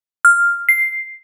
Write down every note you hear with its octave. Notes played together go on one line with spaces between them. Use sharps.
F6
C7